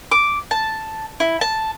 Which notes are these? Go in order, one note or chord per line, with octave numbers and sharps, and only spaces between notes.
D6
A5
E4
A5